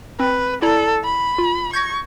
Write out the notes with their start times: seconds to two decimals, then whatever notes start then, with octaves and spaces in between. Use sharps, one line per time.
0.20 C4 B4
0.62 E4 A4 D5 A#5
1.04 B5
1.38 F4
1.73 C#6 G6 G#6 A#6